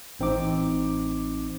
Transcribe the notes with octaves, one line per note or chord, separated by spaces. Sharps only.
A1 C4 D#4 D6